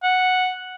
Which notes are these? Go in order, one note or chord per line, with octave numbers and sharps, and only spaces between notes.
F#5